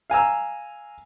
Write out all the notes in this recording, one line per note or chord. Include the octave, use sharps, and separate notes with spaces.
F5 G#5 A#5 E6